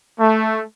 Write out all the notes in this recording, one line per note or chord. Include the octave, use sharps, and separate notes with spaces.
A3